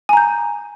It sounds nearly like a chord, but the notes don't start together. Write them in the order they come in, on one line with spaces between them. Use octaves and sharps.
G#5 A#5 G6